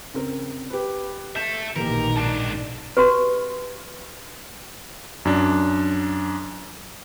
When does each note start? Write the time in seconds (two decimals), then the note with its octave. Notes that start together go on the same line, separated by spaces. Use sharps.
0.14 C#3 C4 A#4
0.70 G4 B4
1.36 E5 A5 G6
1.76 A#1 B2 D#3 E3 A#3 G4 A#4
2.16 G#2 D4 A5
2.97 F#4 G4 B4
5.25 F#2 D4